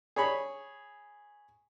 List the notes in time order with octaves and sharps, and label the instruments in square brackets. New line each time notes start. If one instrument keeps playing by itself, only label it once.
[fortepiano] G#4 C#5 B5